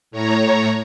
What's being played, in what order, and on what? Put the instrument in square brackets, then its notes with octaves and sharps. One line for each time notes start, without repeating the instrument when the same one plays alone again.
[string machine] A2 C#5 A#5